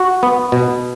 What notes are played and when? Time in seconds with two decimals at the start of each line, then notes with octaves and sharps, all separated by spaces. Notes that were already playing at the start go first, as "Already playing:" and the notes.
Already playing: F#4
0.23 B3
0.52 B2